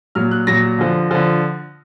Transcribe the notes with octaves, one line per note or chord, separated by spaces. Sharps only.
A#2 F#3 F6
F#6
A#2 F#3 A#6
D3 F3
D3 F3